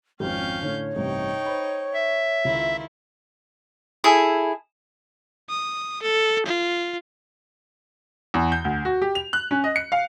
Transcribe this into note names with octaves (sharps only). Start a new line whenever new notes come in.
G#1 F2 C#4 F5 G5 G6
A2 D3 C#5
A1 G2 C3 D#4 G5 C#6
C5 B5
E5
C#2 D#3 E4 F4
E4 G#4 A4
D#6
A4
F4
E2
G6
D2
F#4
G4
F7
F#6
C#4
D#5
C#7
F5